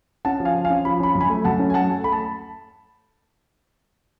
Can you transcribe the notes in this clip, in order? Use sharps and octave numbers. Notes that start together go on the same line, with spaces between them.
C#4 F#5 A5
F3
F5 G#5
F3
F5 G#5
C#4
F3 B5
C#4 B5
F#2
G#5 B5
A3
F#2 F#5 A5
C#4
G#5
A3 F#5 A5
A3
A3 B5
A5